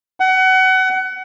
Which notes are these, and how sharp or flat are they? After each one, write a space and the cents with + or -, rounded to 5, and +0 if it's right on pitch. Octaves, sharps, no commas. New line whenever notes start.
F#5 +25